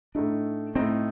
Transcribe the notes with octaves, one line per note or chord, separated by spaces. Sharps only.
A2 A3 D4 D#4
A2 A3 C4 D#4